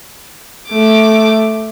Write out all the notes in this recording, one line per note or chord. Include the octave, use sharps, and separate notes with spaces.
A3 D6